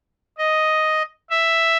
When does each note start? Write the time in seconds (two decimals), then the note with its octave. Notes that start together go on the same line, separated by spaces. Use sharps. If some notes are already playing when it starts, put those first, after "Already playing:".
0.38 D#5
1.30 E5